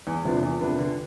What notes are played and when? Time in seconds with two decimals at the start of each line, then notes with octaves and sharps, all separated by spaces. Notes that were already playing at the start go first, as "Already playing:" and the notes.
0.07 E2
0.25 C3 F3 B3 D4
0.43 E2
0.61 C3 F3 B3 D4
0.79 D3